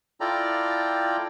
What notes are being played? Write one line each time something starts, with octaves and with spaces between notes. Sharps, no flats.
E4 F4 A4 D5 G5 A#5